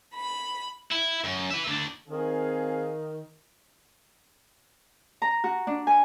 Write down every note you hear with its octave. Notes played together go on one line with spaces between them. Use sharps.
B5
E4
F#2
B4 E5
D2 D4
D#3 C4 G#4 F5
A#5
F#4
D4
G#5